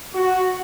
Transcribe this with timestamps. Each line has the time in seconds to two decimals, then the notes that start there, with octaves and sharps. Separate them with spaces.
0.15 F#4